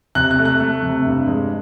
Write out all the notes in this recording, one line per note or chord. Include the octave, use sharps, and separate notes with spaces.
C3 F#6
F#6
A3
F#6
A3
C3
G2
G#3